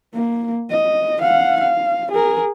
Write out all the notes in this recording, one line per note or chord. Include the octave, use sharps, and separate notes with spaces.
A#3
D#5
F5 F#5
F5
G#4 A#4